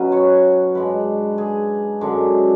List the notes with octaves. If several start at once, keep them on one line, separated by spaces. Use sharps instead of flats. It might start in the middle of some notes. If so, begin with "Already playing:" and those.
Already playing: B2 F#3 C#4 B4
C#5
G#2 G#3 D4 B4
G#4
F#2 D3 G#3 D4